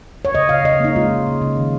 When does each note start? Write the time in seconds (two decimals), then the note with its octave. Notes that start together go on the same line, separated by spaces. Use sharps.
0.25 C#5
0.35 C#3 D#5
0.49 C#3 F5
0.64 C#3 D#5
0.80 A#3 D#4
0.96 G#3 F4
1.11 C#3
1.27 C#3
1.42 C#3
1.57 D#3